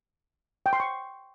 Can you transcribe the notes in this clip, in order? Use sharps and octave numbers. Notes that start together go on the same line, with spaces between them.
G5
C6
C#6